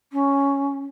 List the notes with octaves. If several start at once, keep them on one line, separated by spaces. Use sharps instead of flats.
C#4